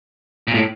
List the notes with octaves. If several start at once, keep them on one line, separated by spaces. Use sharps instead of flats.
A#2
A2